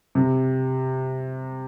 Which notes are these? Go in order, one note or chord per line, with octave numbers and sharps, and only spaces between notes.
C3